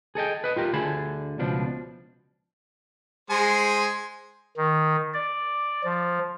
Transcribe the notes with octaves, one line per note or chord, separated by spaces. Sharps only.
G#4 A4 D#5 G5
B4 D#5
F4 G4 A#4
D2 D3 G#4 A5 B5
C#2 B2 F3 D4
G#3 C5 G#5
D#3
D5
F3